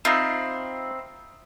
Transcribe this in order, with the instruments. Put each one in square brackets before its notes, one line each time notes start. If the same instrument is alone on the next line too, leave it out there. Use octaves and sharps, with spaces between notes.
[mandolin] C4 [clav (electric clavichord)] D#4 F4 [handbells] E5 B5 C7